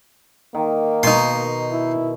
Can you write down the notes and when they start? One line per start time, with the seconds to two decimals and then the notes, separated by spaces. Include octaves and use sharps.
0.55 D#3 A#3
1.03 B2 D#4 C6
1.71 E4